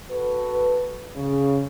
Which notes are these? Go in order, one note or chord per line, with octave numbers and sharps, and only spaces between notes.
F#4 A4 B4
C#3